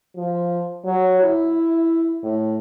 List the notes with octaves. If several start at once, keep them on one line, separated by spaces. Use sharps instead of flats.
F3
F#3
E4
A2